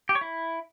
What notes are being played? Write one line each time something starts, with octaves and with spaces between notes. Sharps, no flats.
G4
C#5
E4